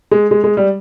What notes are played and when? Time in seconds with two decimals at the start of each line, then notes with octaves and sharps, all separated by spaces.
0.11 G#3
0.31 G#3
0.44 G#3
0.57 G3